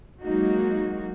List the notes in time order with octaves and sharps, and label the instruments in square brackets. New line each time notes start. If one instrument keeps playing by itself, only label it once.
[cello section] F#3 G#3 A#3 D#4 F#4